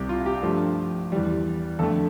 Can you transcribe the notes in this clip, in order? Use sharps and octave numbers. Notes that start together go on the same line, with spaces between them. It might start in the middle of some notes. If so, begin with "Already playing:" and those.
Already playing: C2 C3 G3 G4
F4
G4
G2 F3 A3
E2 E3 G3
F2 D3 A3 A4